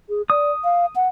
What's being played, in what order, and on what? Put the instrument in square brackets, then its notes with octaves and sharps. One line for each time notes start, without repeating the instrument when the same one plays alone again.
[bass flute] G#4
[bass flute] D5 [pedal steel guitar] D#6
[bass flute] F5
F#5